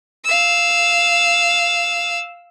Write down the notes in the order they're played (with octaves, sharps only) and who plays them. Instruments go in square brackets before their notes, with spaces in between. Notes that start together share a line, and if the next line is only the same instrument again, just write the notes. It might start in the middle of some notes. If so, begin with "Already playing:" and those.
[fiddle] F5 E6